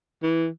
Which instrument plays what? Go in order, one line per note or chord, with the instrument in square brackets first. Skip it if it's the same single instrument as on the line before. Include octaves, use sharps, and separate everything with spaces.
[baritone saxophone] E3